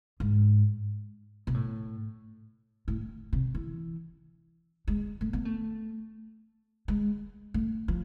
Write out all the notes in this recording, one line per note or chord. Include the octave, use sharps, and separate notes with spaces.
G#2
B2
A2
A2
C3
E3
G#3
A3
B3
A3
G#3
A3
F3